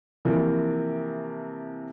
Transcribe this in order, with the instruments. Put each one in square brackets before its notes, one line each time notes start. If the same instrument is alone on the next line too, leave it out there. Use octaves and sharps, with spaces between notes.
[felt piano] C3 E3 F3 A#3